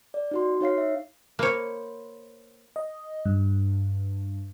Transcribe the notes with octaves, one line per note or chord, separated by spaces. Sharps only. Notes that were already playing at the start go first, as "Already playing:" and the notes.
D5
D#4 F#4 C6
D#4 C#5 F5 C7
E5
A#3 C5 C#5 B5
D#5
G2